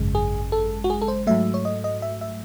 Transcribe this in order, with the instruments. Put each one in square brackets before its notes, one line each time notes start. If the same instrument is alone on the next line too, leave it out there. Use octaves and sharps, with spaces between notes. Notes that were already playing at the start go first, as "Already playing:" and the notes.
Already playing: [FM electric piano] G#1 F#2 C#3 G#3
G#4
A4
F#4
G#4
A4
C5
G#2 F#3 A3 E5
C#5
D#5
D#5
E5
E5